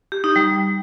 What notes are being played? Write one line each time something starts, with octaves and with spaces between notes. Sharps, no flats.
G4
D#4
G3